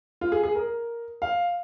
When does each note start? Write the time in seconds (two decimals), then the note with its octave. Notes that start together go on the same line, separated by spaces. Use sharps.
0.21 F4
0.32 G#4
0.43 G#4
0.55 A#4
1.22 F5